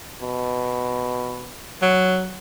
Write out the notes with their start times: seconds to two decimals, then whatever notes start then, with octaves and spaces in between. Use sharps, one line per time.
0.21 B2
1.82 F#3